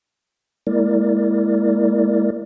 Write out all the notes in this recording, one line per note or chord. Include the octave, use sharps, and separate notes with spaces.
G#3 A#3 E4 A#4 D5